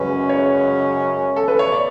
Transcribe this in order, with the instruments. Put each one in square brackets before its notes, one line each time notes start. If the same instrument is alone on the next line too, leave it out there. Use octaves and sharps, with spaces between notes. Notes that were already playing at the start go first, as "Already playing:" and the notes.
Already playing: [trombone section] F#2 C#3 G#3 C#4 [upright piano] B4
[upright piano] C#5
A4
B4
C#5
D5